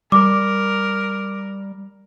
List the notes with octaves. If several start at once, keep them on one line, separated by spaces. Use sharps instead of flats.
G3 A#4 D6